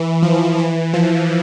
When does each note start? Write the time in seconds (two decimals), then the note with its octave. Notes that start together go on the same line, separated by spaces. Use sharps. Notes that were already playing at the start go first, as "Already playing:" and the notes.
Already playing: E3
0.22 F3
0.58 E3
0.94 F3